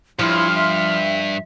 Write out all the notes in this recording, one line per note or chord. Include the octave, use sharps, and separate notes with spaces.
G2 F3 E4 C6 F6
E5